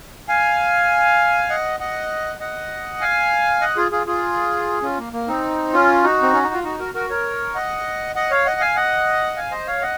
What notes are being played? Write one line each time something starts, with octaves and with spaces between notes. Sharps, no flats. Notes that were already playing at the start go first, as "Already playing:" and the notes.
F5 G#5
D#5 F#5
D#5 F#5
D#5 F#5
F5 G#5
D#5 F#5
F4 G#4
F4 G#4
F4 G#4
C#4 F4
A#3
A#3
C4 D#4
C#4 F4
D#4 F#4
C4
C#4
D#4
F4
D#4 F#4
F#4 A#4
F#4 A#4
A#4 C#5
D#5 F#5
D#5 F#5
C#5 F5
D#5 F#5
F5 G#5
D#5 F#5
F5 G#5
C5 D#5
C#5 F5
D#5 F#5